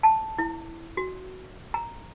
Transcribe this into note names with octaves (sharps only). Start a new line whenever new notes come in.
A5
E4
F#4
A#5